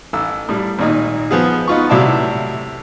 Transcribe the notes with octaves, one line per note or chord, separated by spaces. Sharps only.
A1 E6
A2 G3
G#1 A#2 D#4
F3 B3 G#4
B3 D#4 F4 C#6
A2 C3 F#3 E4 D5 A5